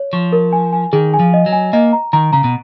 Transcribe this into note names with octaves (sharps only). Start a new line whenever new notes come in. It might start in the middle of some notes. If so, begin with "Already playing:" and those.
Already playing: C#5
F3 C#6
A#4
G#5
G#5
D#3 G#4
G#5
F3
D#5
F#3
G#5
A#3 D#5
A#5
D#3 A#5
C#3 A#5
B2